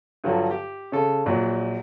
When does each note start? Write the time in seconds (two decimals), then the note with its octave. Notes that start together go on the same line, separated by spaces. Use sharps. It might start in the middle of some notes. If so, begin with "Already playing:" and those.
0.24 G2 D3 F3 F#3
0.51 G4
0.92 C#3 A4
1.26 A#1 A#2 F#3